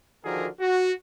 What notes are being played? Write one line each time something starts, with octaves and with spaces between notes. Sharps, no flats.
D3 D#3 F3 F#4 G#4 A#4
F#4